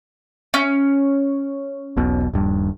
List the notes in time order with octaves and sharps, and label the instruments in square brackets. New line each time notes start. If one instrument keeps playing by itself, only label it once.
[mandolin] C#4
[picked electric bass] E1 B1 B2
D#1 G2